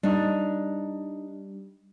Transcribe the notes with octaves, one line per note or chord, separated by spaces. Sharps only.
G3 D4 D#4